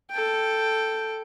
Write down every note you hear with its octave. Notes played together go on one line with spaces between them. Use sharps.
A4 G5